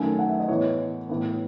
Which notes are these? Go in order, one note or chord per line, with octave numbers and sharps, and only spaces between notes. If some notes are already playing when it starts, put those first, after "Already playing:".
Already playing: F#2 D#3 A3 G#5
F#5
E5
D#5
A2 E3 B3 C#5
A2 E3 B3